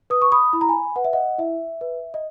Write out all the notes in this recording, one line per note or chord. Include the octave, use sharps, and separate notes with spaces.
B4 D#6
C#6
B5 D#6
E4 B5
A#5
G#5 B5
B4 F#5
E5
D#5 F#5
E4 E5
B4
D#5